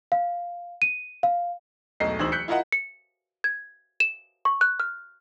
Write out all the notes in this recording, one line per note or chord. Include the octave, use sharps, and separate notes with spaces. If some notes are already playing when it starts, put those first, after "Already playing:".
F5
D#7
F5
E1 B1 A3 D#5 C7
D1 E3 D#4 C5 E6 F#7
F#6 G6 B6 C#7
E4 F4 A#4 D#5 F#5
C#7
G#6
E7
C#6
F#6
F6